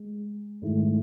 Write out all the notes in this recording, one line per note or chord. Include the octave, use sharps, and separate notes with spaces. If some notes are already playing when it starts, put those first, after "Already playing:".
Already playing: G#3
G#2 D#3 A3 E4